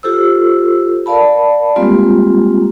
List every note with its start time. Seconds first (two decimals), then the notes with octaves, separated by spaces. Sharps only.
0.03 F4 G4 A4 C5 E6
1.06 A#4 D5 F5 A5 B5
1.76 G3 G#3 A#3 C4 F4 G4